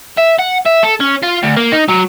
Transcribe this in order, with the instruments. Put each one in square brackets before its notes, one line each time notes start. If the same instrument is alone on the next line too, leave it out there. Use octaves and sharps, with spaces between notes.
[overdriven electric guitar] E5
F#5
E5
A4
C#4
F4
D2
A#3
D#4
F#3